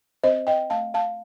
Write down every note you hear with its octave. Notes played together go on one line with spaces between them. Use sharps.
C4 C5 D#5
D#5 G5
A3 F5 A5
F5 A5